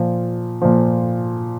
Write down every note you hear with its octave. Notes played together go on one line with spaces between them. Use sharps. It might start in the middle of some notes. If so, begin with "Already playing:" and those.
Already playing: A#2 F3
A#2 F3